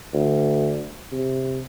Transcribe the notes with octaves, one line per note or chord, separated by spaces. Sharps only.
D2
C3